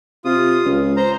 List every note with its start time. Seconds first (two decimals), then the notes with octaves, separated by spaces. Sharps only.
0.25 C3 F4 D#6
0.65 C#2
0.97 C5 A#5